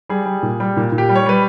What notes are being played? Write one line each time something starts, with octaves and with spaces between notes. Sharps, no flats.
G3 G#4
G3
A#2
G3
A#2
A#2
G4
G3
C#5
G3 B4